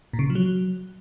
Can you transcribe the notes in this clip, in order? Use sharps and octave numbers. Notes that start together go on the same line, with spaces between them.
A#2
C#3
C3
F3
F#3